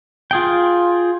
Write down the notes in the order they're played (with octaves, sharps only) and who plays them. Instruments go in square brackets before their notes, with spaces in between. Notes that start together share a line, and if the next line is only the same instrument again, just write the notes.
[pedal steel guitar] F4 G#4 G5